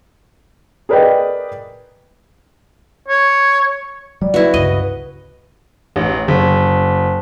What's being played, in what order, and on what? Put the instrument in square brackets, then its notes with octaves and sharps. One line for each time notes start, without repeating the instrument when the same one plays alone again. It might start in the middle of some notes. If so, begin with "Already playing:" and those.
[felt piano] G#4 A#4 B4 D5 D#5 G5
[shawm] C#5
[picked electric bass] F#3 G3 [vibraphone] D5
[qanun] E4 F#4 [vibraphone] B4
[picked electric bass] C#2 G2 C#3 [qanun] D#5
[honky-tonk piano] A1
F#1